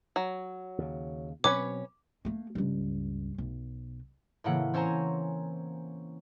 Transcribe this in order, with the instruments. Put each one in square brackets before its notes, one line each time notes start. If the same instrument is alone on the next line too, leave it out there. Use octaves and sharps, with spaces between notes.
[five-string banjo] F#3
[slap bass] D#2 C#3
[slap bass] B2 F#3 C4 [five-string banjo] C#4 B4 C#5 [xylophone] D6
[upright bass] A3 A#3
C#2 G2
B1
[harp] A2 C#3 E3 A#3 F#5
C4 C#4 C5 C#5 G#5 A#5